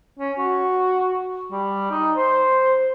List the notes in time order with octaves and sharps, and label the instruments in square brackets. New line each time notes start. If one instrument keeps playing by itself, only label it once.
[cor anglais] C#4
F#4
G3
D#4
C5